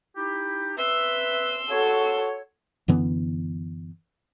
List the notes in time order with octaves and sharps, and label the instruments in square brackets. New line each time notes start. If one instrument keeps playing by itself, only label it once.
[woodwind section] D#4 E4 G4
[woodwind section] B4 E5 [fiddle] C6 E6
[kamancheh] F#4 A4 [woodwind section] C#5
[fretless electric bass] F#2 D3 E3 B3